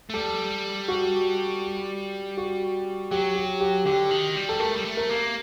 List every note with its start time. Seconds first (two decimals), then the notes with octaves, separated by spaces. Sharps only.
0.10 A3
0.14 G3 A4
0.88 F#4
2.37 F#4
3.11 F#3 G4
3.36 G4
3.61 G4
3.86 D3 G4
4.10 D#3
4.35 G3
4.49 A4
4.60 A3 A#4
4.76 G3
4.85 A3
4.97 A#4
5.10 A#3